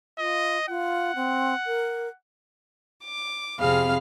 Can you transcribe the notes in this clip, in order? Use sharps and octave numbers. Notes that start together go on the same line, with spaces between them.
F4 D#5
F4 F#5
C4
A#4
D6
F2 C3 G#4 F5 B5 F6